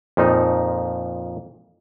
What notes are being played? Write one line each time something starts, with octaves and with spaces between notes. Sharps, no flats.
F2 A#2 F3 D#4